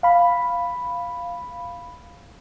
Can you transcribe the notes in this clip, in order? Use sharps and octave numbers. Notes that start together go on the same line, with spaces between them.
F5 B5